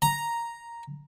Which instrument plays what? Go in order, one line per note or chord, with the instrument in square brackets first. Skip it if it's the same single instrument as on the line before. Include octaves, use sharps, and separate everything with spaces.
[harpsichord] A#5